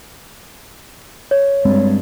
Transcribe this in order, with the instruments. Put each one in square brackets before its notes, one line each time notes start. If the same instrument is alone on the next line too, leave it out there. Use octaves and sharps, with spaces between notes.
[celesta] C#5
[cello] G2 [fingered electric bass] G#3 C4